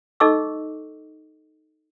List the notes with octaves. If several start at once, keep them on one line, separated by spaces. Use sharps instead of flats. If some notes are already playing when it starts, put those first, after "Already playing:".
D#4 A4 D#5 C#6 D6 E6